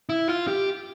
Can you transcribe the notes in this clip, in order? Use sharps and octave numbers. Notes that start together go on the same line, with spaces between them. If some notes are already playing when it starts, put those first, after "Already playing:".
E4
F4
G4